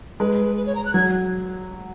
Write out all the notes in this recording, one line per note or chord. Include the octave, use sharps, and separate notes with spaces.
G#3 B4
B4
C#5
A#5
F#6
F#3 G#6